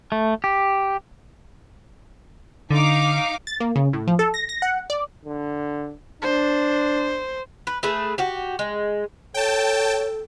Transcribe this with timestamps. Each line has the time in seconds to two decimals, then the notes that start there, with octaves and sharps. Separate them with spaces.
0.12 A3
0.44 G4
2.71 D3 D#4 F5 D6
3.47 A6
3.60 A#3
3.76 C#3
3.93 A2
4.07 F3
4.19 A4
4.34 A#6
4.49 A#6
4.62 F#5
4.90 D5
5.25 D3
6.22 D4 C5
7.67 B4
7.83 A3 G#4 B4
8.18 F#4 G4
8.59 G#3
9.34 A4 C#5 G5 A5